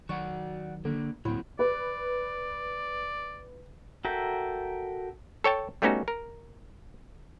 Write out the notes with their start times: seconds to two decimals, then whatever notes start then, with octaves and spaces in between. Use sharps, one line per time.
0.09 D#3 F#3 F#4 D5 F#5 C#6
0.85 D3 A#3 D4
1.25 D2 A2 F#3 A#3 C4 E4 B5
1.59 B4 D5
4.05 F#4 A4 A#4 E5 G5
5.44 A4 C#5 G5 A5
5.82 G3 A3 B3 C#4 D#4 F#4
6.08 A#4